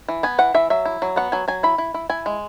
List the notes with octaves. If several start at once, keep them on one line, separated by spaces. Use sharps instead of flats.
E3
B3 G#5
E3 F#5
E3 E5
F#3 E5
E4
F#3
B3 F#5
F#3 G#5
F#3 G#5
E4 B5
E4
E4
E4 G#5
G#3